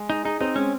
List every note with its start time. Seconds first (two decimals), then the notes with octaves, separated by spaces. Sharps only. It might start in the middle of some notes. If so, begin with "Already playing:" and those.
Already playing: G#3
0.10 D#4 G#4
0.24 D#4 G#4
0.41 C4 D#4
0.56 G#3 C#4